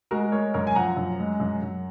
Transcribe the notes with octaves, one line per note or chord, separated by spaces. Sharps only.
G#3 F#4 A#4
G#3 A#4 C#5
F#2 A#4 C#5
G#5
F3 F#5 A#5
F#2
G#3
F#2
F#2